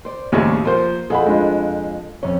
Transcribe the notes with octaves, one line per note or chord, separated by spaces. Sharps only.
C5 D5
D#2 A2 C#3 G3 C4 F#4
F3 A#3 C5
F2 G#4 A4 F#5 B5
G#3 D4 F4
F2 C#4 C#5